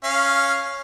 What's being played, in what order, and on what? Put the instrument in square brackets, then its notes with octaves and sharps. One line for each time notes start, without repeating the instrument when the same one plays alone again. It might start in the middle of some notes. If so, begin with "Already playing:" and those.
[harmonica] C#4 F5